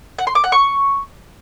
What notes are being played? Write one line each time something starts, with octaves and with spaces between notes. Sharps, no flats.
F#5
C6
D6
F#5
C#6